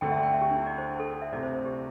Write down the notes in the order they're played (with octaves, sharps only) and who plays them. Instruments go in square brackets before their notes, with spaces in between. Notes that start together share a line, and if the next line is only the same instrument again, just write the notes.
[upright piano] D2 D3 A3 [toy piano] G5
[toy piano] E5
G5
E5
G4
D4
E4
D5
C5
A4
A4
E5
[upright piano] C2 C3 A3 [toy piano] D5
[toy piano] C5
C5
G4